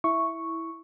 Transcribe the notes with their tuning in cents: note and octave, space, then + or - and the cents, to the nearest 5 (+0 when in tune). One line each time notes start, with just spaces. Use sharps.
E4 -5 E5 +0 C#6 +0